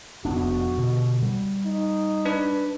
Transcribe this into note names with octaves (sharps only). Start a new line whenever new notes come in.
F1 B3 D4 F#4
B2 D3
G3
D#4
D4 B4